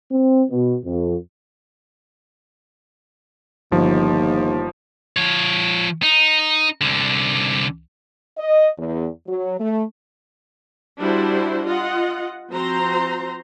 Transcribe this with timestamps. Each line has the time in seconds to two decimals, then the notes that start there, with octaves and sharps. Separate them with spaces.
0.10 C4
0.50 B2
0.84 F2
3.72 G1 D#2 F3
5.16 F3 C#5
6.03 D#4
6.81 C2 D3
8.38 D#5
8.78 E2
9.27 F#3
9.60 A3
10.99 G3 D4 E4 F#4 C5
11.66 F4 D#5 F#5
12.51 F3 C4 F#4 C5 A#5 C6